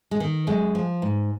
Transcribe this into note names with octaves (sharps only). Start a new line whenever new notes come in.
G#3
D#3
F#2 G#3
F3
G#2